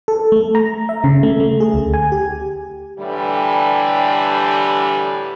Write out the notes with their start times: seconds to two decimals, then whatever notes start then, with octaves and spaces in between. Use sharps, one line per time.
0.08 A4
0.32 A3
0.55 A#5
0.89 E5
1.04 C#3
1.23 A3
1.40 A3
1.60 G#4
1.74 D2
1.94 G#5
2.12 G4
2.98 A2 D3 E3 G3